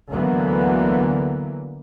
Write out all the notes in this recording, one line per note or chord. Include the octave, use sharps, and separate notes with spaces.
D2 D3 E3 F#3 A#3 B3